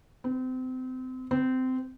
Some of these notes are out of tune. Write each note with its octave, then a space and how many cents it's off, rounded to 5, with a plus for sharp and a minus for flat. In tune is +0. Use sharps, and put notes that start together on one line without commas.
C4 -30
C4 -20